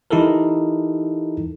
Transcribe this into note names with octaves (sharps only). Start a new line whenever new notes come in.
E3 D#4 E4 G4 A4 A#4